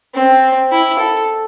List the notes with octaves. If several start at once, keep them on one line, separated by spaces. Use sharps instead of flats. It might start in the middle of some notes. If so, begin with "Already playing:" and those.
C4
E4
A4